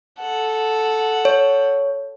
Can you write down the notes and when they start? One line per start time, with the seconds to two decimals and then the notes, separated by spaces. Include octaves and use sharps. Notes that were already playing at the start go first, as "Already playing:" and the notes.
0.20 A4 F#5
1.25 C#5